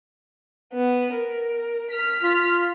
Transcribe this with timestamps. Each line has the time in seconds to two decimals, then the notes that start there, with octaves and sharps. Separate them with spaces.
0.73 B3
1.14 A#4
1.91 F6 B6
2.22 F4